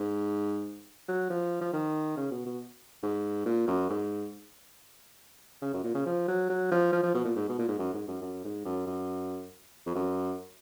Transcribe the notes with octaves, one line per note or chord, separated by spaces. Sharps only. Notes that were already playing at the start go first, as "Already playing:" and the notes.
Already playing: G#2
F#3
F3
F3
D#3
C#3
B2
B2
G#2
A#2
F#2
G#2
C#3
F#2
A#2
C#3
F3
F#3
F#3
F3
F3
F3
B2
A#2
G#2
B2
A#2
G#2
F#2
G#2
F#2
F#2
G#2
F#2
F#2
F2
F#2